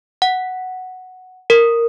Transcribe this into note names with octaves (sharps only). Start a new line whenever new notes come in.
F#5
A#4